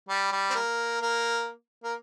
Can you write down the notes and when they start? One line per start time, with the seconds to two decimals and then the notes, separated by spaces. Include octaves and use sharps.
0.09 G3
0.32 G3
0.50 C4
0.55 A#3
1.01 A#3
1.84 A#3